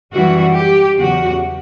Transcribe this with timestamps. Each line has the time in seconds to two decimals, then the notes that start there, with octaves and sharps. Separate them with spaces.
0.12 F#2 E3 G3 F#4
0.56 G4
0.98 E2 C#3 F#3 F#4